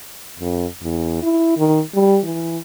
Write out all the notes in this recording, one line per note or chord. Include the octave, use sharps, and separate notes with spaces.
F2
E2
E4
D#3
G3
E3